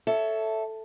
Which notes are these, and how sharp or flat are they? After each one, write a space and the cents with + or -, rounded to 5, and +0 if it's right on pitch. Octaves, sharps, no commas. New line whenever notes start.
A4 +0 C#5 +20 E5 +0